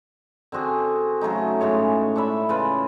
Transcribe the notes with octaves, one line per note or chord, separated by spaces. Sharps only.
D3 C4 F#4 G#4
C#3 F#3 A3 D#4
A2 C#3 G#3 C#5
D4 C#5 E5 B5
C#3 F4 B4